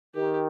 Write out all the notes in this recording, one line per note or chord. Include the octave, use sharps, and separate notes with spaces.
D#3 G4